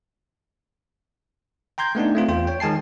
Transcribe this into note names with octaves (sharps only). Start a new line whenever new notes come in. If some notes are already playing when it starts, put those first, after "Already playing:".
G5 A#5 C6 G6 G#6
A3 B3 D4 D#4
A3 C4 F4
E2 F4 G5
C#5 G5
D#3 G#3 G#5 A5 C7